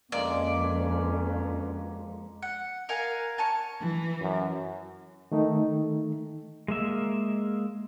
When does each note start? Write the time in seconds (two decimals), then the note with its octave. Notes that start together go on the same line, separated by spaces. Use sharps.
0.12 F2 B2 D3 G#3 A#3 C#4 D5
2.42 F#5
2.89 A#4 F5 F#5 G#5
3.38 C#5 G#5 A5
3.81 E3
4.21 F#2
5.32 D#3 A3 D#4
6.68 G#3 A#3 E5